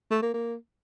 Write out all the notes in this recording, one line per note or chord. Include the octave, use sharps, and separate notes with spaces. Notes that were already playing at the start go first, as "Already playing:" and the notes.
A3
A#3
A#3